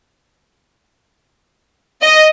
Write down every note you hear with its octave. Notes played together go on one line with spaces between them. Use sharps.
D#5